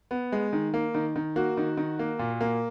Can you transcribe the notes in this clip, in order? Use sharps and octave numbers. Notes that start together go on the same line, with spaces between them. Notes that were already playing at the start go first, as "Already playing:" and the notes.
B3
G#3
D#3
A#3
D#3
D#3
A#3 F#4
D#3
D#3
A#3
A#2
A#3